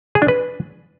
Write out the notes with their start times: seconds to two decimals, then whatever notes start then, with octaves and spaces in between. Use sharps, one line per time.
0.15 G#4
0.22 D4
0.28 B4